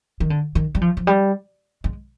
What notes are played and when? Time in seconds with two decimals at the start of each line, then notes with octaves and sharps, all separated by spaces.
0.20 D#3
0.30 D3
0.55 D#3
0.75 G3
0.81 F3
0.97 F3
1.07 G3
1.84 G#3